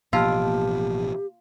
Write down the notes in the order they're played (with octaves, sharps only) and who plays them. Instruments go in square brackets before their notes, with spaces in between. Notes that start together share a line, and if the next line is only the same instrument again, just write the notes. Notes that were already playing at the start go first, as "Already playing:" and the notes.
[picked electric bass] A1 B2 F3 [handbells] A#3 A5 F6 [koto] F4 [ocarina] G4